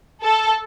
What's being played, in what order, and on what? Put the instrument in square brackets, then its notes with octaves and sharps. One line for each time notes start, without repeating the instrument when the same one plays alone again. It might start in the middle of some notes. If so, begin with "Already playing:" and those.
[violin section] A4